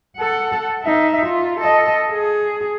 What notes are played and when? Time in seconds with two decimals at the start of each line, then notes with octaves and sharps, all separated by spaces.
0.17 A4 F#5
0.82 D#4 E5
1.26 F4
1.60 A4 D#5
2.12 G#4